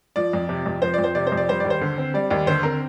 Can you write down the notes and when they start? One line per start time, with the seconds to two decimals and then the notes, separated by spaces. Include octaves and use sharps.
0.16 F3 D5
0.33 F2
0.49 C3
0.66 F2
0.82 F3 C5
0.94 F2 D5
1.04 C5
1.15 C3 D5
1.27 C5
1.32 F2
1.37 D5
1.48 G3 C5
1.60 D#2 D5
1.70 C5
1.81 D3
1.98 C4
2.14 G3 D5
2.30 D#2 D5
2.47 D3 C5
2.63 C4 A#4